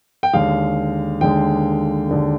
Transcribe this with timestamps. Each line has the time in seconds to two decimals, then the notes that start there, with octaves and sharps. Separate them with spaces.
0.23 G5
0.33 D#2 D3 G#3 F5
1.21 D#2 D3 G#3 G5
2.09 D#2 D3 G#3